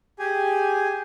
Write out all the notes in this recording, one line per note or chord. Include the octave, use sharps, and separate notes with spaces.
G4 G#4 G#5